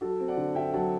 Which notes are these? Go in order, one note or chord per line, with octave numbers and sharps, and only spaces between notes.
F#3 F#4 A4
C4
D5 F#5
D3
D3 E5 G5
F#3 F#5 A5